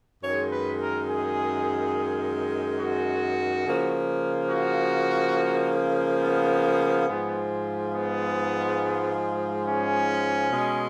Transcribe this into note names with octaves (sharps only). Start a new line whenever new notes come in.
F#2 D#3 G#3 C#5
B4
A#4
G#4
F#4
C#3 F3 A#3
F#4
B3
G#2 F3 G#3
B3
C#4
B2 G#3